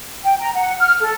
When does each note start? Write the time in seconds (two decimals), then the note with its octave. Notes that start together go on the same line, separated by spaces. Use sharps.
0.23 G5
0.40 A#5
0.54 F#5
0.80 F6
1.01 A4